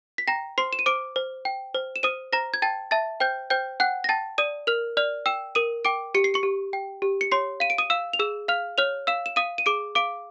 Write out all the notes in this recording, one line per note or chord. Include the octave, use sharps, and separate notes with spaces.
B6
G5 A#5 A#6
C5 C6 C7
E7
D#7
C5 D6 D7
C5
G5
C5
E7
C5 D#6 D#7
C5 A#5 A#6
G#6
G5 A5 A6
E5 A5 A6
C5 G5 G6
C5 G5 G6
F#5 G5 F#6
A#6
G5 A5 A6
D5 D#6 D#7
A#4 F6 F7
D5 F6 F7
G5 E6 E7
A#4 D#6 D#7
G5 D6 D7
G4 C#7
C7
C#6 C#7
G4
G5
G4
C#7
C#5 C6 C7
F5 D#7
D7
D#6 D#7
F5 E6 E7
F7
G#4 E6 E7
F5 F6 F7
C#5 F6 F7
F5 E6 E7
E7
F5 D#6 D#7
D#7
G#4 D6 D7
F5 D6 D7